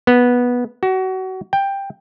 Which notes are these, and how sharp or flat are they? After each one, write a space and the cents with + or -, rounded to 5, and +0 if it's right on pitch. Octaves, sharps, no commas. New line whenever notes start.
B3 -10
F#4 +25
G5 +10